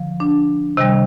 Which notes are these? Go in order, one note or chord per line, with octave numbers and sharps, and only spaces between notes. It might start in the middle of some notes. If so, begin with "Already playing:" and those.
Already playing: D3 F3
D4
C3 D#3 G3